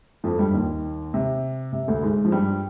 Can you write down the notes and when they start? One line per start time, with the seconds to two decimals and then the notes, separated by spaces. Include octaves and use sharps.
0.24 F2 F3
0.38 G2 G3
0.53 D#2 D#3
1.14 C3
1.72 C3
1.87 D2 D3
2.03 G#2 G#3
2.25 F3
2.32 G2 G3